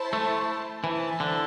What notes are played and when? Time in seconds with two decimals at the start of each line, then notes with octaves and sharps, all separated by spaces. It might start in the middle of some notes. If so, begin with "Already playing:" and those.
Already playing: E4 C5 A5
0.13 A3
0.84 E3 E4 C5 A5
1.20 D3